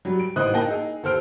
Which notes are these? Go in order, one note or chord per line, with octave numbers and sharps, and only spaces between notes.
F#3 G3
D7
A1 A2 D#4 C5 D#6 F#6
A#3 G5 A5 A#6
D#4 G#4
D#2 A4 C5 F6 D7